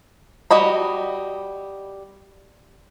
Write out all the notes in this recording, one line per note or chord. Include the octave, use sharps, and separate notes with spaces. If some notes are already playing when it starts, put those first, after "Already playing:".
G3 F#4 D#5 B5